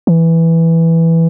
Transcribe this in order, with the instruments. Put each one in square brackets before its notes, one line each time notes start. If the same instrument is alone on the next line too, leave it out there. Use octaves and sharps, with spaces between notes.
[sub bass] E3